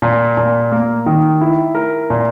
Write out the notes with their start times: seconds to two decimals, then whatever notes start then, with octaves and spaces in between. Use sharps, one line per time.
0.02 A#2
0.37 A#2
0.72 A#3
1.06 D#3
1.41 E4
1.75 A#4
2.10 A#2